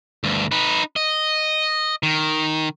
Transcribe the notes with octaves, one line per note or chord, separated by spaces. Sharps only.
D2 G2
D#4 B4
D#5
D#3